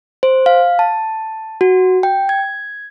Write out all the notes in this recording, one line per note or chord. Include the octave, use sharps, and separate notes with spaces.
C5
F5
A5
F#4
G5
G#6